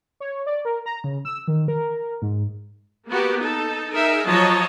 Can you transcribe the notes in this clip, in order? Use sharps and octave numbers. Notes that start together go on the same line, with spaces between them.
C#5
D5
A#4
A#5
C#3
E6
D#3
A#4
G#2
A#3 B3 F#4 G4
D#4 A4
D#4 G#4 A#4 E5
F3 F#3 C#5 D#5 A5 A#5